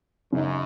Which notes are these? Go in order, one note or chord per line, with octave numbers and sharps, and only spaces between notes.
F#2 C#3 G#3 D#4